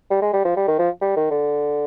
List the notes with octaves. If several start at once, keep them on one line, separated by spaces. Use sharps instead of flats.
G3
G#3
G3
F3
G3
D#3
F3
G3
D#3
D3